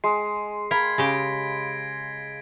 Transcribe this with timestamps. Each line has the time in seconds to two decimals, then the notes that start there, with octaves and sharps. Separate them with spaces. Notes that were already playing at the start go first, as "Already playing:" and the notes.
0.04 G#3 C7
0.71 A#4 F5 B5 G#6 B6 G7
0.98 C#3 G4 A#6 D7